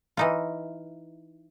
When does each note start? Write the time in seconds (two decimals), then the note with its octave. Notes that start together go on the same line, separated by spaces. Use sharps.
0.17 E3 D#4 F4